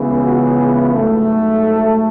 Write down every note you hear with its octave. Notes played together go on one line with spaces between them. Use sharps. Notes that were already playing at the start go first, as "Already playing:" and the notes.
Already playing: C#2 C#3 E3 B3
F#4
G#4
G#2 F#3 A3
A4